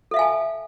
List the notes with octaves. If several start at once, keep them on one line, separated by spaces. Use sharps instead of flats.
A4 E5 F5 G#5 A5